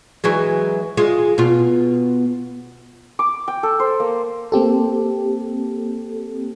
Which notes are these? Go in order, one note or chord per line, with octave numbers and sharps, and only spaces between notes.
E3 F#3 G#3
G#3 F4
B2 F4
D6
G5
A4
C5
A#3
A#3 C4 G4 A4